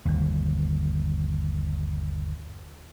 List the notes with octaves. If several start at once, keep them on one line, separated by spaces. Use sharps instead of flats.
G1 D#2